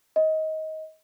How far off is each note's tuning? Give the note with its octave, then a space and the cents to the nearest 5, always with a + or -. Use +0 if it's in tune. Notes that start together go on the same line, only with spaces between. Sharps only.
D#5 +20